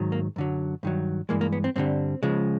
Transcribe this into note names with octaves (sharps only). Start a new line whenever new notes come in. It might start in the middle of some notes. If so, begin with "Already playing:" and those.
Already playing: G#2 D#3 F#3
A#3
F#2 D3 F#3
G2 D#3 F#3
G2 E3 G#3 A#3
A#3
B3
C4
G2 D3 G3 C4
C#2 C#3 F3 G#3